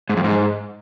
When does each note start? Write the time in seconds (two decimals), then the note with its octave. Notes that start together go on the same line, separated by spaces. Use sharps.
0.09 G#2
0.17 F2
0.24 G#2